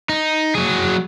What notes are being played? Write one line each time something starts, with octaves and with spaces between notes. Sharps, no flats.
D#4
F#3 G#4